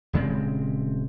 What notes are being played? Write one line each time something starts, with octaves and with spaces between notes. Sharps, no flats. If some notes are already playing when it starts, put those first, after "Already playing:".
D#1 C#3 G#3 C4